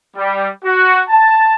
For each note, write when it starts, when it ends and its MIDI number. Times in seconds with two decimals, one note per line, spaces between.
0.16 0.47 55
0.64 1.00 66
1.09 1.55 81